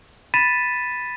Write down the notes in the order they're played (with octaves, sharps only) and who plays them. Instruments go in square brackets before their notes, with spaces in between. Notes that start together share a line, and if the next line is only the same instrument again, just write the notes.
[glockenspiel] B5 A6 B6 D#7 E7